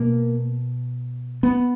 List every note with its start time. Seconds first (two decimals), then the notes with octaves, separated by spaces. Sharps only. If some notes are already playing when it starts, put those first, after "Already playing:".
Already playing: B2 A#3
1.43 B3